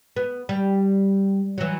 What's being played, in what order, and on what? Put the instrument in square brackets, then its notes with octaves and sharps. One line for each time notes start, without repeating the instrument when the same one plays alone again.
[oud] B3
G3
E3 F#3